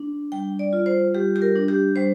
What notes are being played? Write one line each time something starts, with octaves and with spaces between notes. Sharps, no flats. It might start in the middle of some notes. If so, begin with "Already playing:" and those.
Already playing: D4
G3 G5
D5
F4
C5
G3 G4
G4
A#4
D4
G4
G3 C5